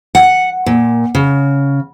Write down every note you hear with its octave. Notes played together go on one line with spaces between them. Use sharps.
F#5
A#2
C#3